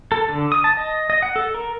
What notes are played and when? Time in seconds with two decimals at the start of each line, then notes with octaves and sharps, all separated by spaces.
0.12 A4
0.29 D3
0.52 D#6
0.64 A5
0.77 D#5
1.10 D#5
1.22 F#5
1.36 A4
1.55 A#4